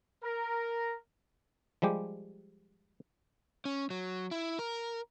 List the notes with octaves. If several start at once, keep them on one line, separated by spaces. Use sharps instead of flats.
A#4
F3 G3 G#3 G4
C#4
F#3
E4
A#4